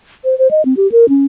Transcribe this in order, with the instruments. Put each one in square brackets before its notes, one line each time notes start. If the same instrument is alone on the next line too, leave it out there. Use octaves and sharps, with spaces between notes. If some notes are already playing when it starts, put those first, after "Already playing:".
[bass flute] C5
C5
D#5
C4
G4
A#4
C#4